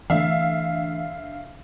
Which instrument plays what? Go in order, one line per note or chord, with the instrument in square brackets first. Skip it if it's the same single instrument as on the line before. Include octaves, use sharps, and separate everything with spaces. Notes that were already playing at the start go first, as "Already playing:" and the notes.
[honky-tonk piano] D3 E5 F5 [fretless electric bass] E3 A3